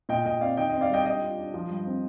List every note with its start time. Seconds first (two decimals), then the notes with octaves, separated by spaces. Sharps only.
0.09 A#2 D#5 G5
0.25 A#2 D#5 G5
0.41 C4 D5 F5
0.57 D#3 D#5 G5
0.69 C4 D#5
0.81 D5 F5
0.90 G3 D#5 G5
1.06 D4 D#5 G5
1.22 F4
1.38 D4
1.54 F3
1.70 G2
1.86 C4